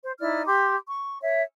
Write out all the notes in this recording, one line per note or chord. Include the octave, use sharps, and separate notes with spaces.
C5
D#4 E4 D5 F6
G4 C6 D6
C#6
C#5 E5